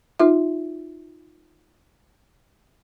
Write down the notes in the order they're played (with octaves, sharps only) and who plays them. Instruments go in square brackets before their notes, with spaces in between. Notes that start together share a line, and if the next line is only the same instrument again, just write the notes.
[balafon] D#4 F4 E5